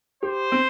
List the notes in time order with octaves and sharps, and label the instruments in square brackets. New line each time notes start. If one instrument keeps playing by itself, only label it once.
[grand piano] G4 [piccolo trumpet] C5
[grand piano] C4